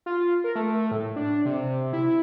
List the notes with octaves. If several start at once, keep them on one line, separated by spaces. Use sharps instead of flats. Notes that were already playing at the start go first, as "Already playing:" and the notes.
F4
A#4
A3
A2
D4
C3
E4